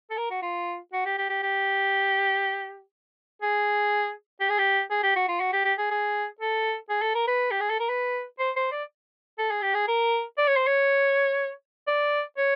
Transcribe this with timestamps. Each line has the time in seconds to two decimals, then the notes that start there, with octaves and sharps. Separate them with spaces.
0.10 A4
0.17 A#4
0.30 F#4
0.42 F4
0.93 F#4
1.06 G4
1.18 G4
1.29 G4
1.42 G4
3.42 G#4
4.40 G4
4.49 G#4
4.59 G4
4.91 G#4
5.03 G4
5.16 F#4
5.28 F4
5.40 F#4
5.53 G4
5.65 G4
5.78 G#4
5.91 G#4
6.40 A4
6.90 G#4
7.01 A4
7.15 A#4
7.27 B4
7.51 G4
7.61 G#4
7.70 A4
7.80 A#4
7.89 B4
8.39 C5
8.56 C5
8.72 D5
9.38 A4
9.51 G#4
9.62 G4
9.74 G#4
9.88 A#4
10.38 D5
10.48 C#5
10.56 C5
10.67 C#5
11.87 D5
12.37 C#5